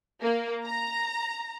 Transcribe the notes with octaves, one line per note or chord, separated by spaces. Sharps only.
A#3
A#5